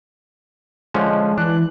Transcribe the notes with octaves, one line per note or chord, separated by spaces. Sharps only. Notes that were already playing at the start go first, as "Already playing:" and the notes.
D3 F3 G#3 C#4
E3 D4 F#6